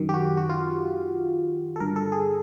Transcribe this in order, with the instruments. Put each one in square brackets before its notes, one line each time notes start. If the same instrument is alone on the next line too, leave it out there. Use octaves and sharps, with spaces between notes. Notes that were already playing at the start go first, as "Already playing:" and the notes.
Already playing: [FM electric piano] F#2 D#3
G4
F#4
F#4
F4
A4
G2 D3 A#4
A4
G#4